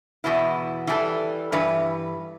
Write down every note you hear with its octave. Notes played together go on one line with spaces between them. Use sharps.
E2 B2 B3 E4
E3 G3 D4 A4
G2 E3 B4